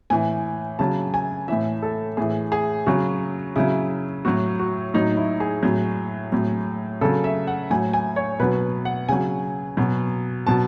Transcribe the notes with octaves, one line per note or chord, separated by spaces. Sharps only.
A2 E3 G#5
C#3 F#3 A5
G#5
A2 E3 E5
A4
A2 E3 G#4
G#4
C#3 F#3 F#4
C#3 F#3 E4
A2 F#3 F#4
F#4
A2 F#3 D#4
E4
G#4
A2 F#3
A2 F#3
C#3 F#3 A4
E5
F#5
A2 F#3 G#5
G#5
C#5
B2 F#3 B4
F#5
C#3 F#3 G#5
B2 F#3
B2 F#3 A5